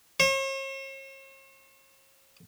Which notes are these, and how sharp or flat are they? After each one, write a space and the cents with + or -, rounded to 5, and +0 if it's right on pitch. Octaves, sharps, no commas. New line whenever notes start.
C#5 -45